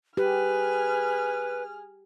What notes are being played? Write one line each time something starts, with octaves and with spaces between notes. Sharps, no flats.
G4 G#4 B4 F6